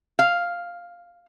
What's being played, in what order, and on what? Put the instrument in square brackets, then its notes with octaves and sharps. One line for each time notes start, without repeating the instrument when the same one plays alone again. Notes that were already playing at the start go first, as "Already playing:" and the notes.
[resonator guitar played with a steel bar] F5